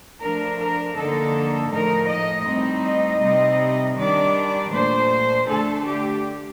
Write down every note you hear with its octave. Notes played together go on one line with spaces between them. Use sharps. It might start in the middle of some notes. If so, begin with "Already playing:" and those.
F3 A3 D4 A#4
A#4
D3 F3 A#3 D#4 A4
A2 F3 A3 D#4 A#4
D#5
A2 G3 C4 D#4
D#5
C3 G3 C4 D#4
D#3 G3 D4 D5
A#2 A3 D4 C5
D3 A3 D4 A4
G4